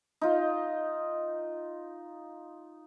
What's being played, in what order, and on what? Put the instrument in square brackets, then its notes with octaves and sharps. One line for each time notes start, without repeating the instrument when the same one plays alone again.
[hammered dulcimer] D#4 F4